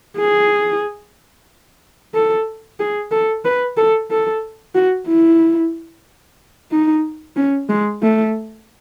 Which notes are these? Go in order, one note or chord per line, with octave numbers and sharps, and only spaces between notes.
G#4
A4
G#4
A4
B4
A4
A4
F#4
E4
D#4
C#4
G#3
A3